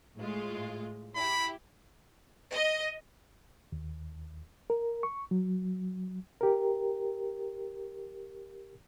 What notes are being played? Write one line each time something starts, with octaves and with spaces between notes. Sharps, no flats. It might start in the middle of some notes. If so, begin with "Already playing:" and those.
A2 G#3 F4
E4 G4 B5
D#5
D#2
A#4
C#6
F#3
G4 A#4